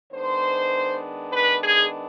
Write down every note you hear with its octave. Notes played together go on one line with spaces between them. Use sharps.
D#3 G#3 B3 D4 C5
B4
G#4